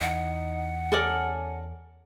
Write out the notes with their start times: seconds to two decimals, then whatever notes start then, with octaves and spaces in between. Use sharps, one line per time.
0.01 E2 D#4 F#5
0.92 C#4 A4 A#4 D5